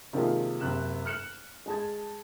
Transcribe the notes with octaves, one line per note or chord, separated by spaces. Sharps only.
C3 D#3 F3 G#3 A#3
F#1 C3 F#6 E7
F6 F#6 C#7 E7 F#7
G#3 A5 G#6